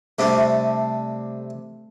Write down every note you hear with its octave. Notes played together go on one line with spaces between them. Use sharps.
C3 G3 A3 D4